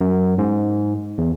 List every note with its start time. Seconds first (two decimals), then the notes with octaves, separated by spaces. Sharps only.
0.01 F#2
0.38 G#2
1.18 E2